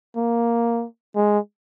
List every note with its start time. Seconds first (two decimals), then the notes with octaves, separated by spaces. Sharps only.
0.16 A#3
1.15 G#3